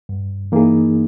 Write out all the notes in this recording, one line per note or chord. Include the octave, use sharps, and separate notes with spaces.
G2
E3 A#3 D#4 G#4